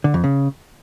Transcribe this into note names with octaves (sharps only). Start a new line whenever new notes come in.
D3
F2
C#3